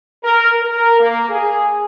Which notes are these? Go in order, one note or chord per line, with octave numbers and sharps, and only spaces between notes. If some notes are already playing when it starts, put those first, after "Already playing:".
A#4
A#4
A#3
G#4